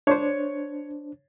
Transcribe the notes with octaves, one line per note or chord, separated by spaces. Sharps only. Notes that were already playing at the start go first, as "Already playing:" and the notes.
D4 C5 C#5